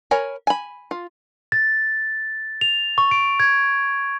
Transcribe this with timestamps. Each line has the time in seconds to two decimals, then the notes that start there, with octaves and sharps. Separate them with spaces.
0.11 A#4 C#5 G#5 B5
0.47 G#5 B5
0.91 F4
1.52 A6
2.61 F7
2.98 C#6
3.11 D7
3.40 G#6